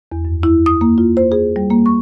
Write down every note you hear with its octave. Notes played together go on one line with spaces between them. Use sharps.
E2
F#2
E4
D#6
A#3
F4
C5
G#4
G3
A#3
C#6